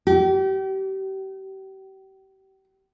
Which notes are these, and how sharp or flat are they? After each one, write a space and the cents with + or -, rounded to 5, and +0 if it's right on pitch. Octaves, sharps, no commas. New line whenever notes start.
G4 -35